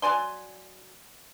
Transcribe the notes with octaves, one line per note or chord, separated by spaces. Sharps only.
F#3 D5 G#5 C6